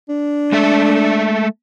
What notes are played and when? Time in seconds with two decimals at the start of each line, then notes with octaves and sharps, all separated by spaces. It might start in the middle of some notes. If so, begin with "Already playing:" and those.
0.09 D4
0.52 G#3 A3 E5